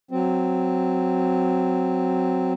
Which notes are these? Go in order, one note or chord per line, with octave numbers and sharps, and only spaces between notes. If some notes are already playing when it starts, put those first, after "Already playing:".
F#3 C4